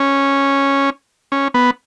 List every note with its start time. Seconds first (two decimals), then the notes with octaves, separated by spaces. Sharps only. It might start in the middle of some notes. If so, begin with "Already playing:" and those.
Already playing: C#4
1.32 C#4
1.54 B3